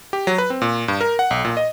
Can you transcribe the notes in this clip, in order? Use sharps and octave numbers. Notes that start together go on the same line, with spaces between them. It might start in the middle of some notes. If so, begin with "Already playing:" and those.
G4
F#3
B4
C4
A#2
G2
A#4
F#5
B1
A#2
D#5